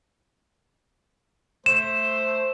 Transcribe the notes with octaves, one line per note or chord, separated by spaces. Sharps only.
A3 C5 E7